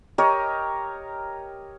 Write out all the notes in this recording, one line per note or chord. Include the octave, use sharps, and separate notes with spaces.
G4 A#4 C#5 D#5